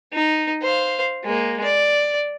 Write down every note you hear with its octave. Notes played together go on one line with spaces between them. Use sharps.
D#4
C5 F5
G#3 A#3
D5